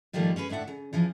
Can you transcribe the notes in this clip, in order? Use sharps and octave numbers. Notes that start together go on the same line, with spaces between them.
G#2 D#3 F3 G3 A3 A#3
C#4 G#4 A#4 B4
D2 A2 D4 E5 F#5
C#3
C#3 E3 F3